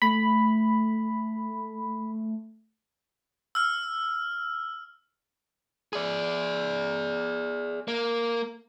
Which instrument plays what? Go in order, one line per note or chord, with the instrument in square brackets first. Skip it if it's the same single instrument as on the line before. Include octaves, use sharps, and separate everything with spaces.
[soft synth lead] A3 [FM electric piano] B5
[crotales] E6 F6
[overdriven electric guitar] G#4 D5
A#3